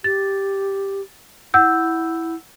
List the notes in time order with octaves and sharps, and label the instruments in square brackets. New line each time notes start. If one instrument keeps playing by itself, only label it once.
[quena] G4 [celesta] A6
[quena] E4 [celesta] F#5 E6 G6